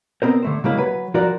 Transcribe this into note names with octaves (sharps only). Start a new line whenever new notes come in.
B3 C4 A#4 C5
D3 A3 C5
C#3 F#3 G#3 A#3 E4
F#3 B4
F3 F#4 A#4 D5